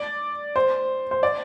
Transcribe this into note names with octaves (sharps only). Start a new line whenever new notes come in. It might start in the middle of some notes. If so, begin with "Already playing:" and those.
Already playing: D5
C5
C5
D5